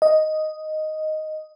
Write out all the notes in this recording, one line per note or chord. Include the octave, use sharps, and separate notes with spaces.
D#5